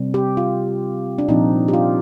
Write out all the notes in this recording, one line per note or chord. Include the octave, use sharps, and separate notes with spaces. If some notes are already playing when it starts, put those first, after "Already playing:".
Already playing: C3 G3 C4
G4
F4
D4
A#2 F3 C4 D#4
G4
F4